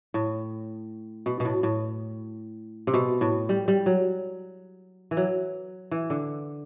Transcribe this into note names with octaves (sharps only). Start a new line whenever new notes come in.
A2
B2
B2
A2
A2
C3
B2
A2
G3
G3
F#3
E3
F#3
E3
D3